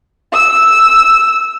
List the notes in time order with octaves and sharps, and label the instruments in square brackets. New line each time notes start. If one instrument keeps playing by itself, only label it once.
[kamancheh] E6